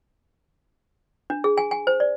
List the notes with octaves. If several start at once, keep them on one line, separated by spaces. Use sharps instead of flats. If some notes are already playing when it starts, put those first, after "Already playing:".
D4
G#4
G#5
G#5
C5
D5